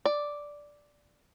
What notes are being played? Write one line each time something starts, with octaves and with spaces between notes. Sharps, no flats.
D5